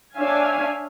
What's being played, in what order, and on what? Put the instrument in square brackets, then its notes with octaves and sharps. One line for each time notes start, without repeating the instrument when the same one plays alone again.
[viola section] D4 C#5 E5 F5 G#5